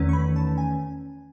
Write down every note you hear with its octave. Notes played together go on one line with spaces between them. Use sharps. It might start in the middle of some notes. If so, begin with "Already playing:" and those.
Already playing: E2 D#3 A3 C#4
C#6
B5
A5
G#5